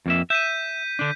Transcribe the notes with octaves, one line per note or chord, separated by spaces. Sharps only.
F2 A#3 E5
E5 G6 B6 D#7
D3 D4